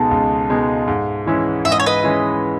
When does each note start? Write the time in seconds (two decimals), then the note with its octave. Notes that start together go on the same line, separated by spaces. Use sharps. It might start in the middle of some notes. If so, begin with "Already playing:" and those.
Already playing: C#2 B2 G#3 D#4 A4
0.11 C#2
0.49 B2 G#3 D#4
0.88 G#2
1.26 E3 G#3 C#4 E4
1.65 G#2 E5
1.72 D#5
1.80 C#5
1.86 B4 D#5
2.03 E3 G#3 C#4 E4